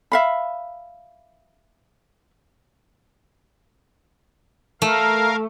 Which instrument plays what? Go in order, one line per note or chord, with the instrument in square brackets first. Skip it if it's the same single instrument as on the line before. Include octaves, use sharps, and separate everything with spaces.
[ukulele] E5 F5 B5
[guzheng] A3 [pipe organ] A#4 F5